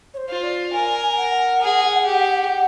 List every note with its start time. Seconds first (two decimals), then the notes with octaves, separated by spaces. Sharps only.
0.14 C#5
0.17 C5
0.29 F4
0.43 D5
0.72 A#4 G#5
1.17 F#5
1.61 G#4
2.06 G4